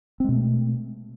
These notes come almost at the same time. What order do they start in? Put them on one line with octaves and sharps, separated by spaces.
C4 G#3 B2 A3